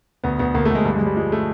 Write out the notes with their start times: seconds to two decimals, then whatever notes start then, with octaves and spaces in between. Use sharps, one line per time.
0.24 D2 B3
0.39 D2 B3
0.54 D2 A#3
0.65 A3
0.70 D2 G#3
0.85 G2 G3
0.96 G#3
1.01 G2
1.06 G3
1.16 F3 G#3
1.32 A3